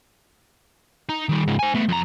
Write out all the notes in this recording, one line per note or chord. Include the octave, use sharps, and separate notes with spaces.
D#4
D#3 G3
C#2 G#2
C5 G#5
A3 B3
F2 A#5